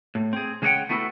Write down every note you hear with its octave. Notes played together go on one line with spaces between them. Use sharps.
A2
C4 G#4
C#3 G#3 C#5 D#5 F#5 G5
A3 B3 E4 F#4 G4 A4